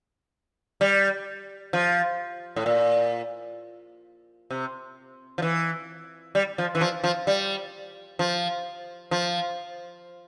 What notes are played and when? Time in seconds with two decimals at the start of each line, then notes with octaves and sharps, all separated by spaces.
0.81 G3
1.73 F3
2.56 A2
2.66 A#2
4.50 C3
5.38 F3
5.42 E3
6.35 G3
6.58 F3
6.75 E3
6.81 F3
7.04 F3
7.27 G3
8.19 F3
9.11 F3